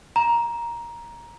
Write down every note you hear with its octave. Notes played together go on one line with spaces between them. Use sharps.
A#5